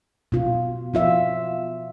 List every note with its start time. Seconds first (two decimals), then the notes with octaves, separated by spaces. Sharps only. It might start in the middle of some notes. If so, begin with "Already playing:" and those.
0.32 B2 F4
0.94 F3 F4 E5